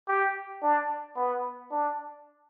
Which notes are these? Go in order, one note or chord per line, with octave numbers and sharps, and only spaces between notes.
G4
D4
B3
D4